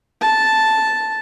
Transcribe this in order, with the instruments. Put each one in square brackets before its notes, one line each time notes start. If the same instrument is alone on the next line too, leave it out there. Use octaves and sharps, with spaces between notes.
[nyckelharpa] A5